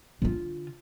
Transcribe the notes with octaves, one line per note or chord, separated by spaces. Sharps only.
D3 F4